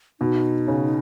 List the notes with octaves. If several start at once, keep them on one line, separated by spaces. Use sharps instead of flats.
B2 D#4
C#3